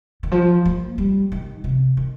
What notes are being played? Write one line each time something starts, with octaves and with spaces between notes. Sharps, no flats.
D#3
F3
A#3
G3
D#3
C3
D#3